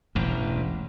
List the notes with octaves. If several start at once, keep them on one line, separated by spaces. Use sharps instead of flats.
E1 A1 G2